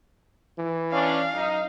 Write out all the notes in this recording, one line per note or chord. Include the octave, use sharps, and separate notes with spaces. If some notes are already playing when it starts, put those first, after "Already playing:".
E3
C#4 D4 F5
F#2 D#4